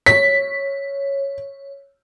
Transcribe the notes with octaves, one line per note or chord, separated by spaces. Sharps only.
C#5 B6